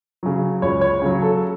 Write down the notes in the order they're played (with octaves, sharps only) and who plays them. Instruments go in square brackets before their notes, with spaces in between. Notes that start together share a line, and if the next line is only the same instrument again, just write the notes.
[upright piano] C#3 F#3
C#2 C#5
C#5
C#3 F#3
A4